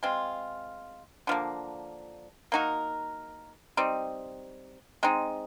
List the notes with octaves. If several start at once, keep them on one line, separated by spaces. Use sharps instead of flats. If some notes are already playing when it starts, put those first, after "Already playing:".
G#3 C4 F4
D3 F3 A#3
A#3 D#4 F#4 A#4
G3 C4 D#4
G#3 C4 D#4